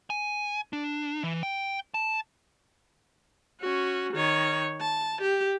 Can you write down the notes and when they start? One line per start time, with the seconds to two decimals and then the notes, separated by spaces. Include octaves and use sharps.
0.10 G#5
0.73 D4
1.23 E3
1.43 G5
1.94 A5
3.61 C#4 F#4
4.13 D#3 C#5
4.81 A5
5.21 G4